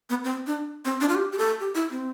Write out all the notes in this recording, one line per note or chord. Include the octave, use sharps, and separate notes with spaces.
B3
C4
D4
C4
D4
F4
G4
G4
A4
G4
E4
C4